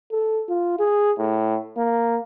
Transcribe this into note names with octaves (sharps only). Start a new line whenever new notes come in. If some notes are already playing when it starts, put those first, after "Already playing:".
A4
F4
G#4
A2
A#3